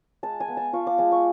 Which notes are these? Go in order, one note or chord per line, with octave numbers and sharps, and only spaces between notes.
G#3 A5
G#5
B3
A5
F4 C#6
D6
G#3 D6
C#6